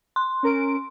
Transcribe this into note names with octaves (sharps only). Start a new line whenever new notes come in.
C6
C#4 A#4 D7